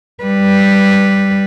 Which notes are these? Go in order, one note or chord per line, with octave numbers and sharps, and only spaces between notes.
G3 B4